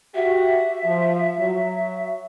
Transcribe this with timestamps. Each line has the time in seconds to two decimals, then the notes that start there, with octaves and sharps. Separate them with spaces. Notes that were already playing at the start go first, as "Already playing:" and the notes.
0.15 F#4 G4 E5
0.85 F3
1.39 F#3